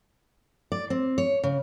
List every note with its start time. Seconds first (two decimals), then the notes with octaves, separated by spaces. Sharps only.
0.72 D5
0.90 C4
1.18 C#5
1.44 C#3